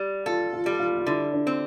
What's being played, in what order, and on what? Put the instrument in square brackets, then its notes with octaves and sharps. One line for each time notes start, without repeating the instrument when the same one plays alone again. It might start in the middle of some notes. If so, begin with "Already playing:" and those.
Already playing: [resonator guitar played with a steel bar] G3 [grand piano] G4
[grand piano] F4 [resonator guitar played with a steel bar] A4
[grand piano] F4
[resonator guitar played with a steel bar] G3
[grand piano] F4
F4
[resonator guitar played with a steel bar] D3 [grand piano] E4
[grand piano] D4
[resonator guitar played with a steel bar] C4